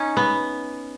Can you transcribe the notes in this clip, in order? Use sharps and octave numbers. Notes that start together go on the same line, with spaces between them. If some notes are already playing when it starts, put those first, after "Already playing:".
Already playing: C#4 D#4
B3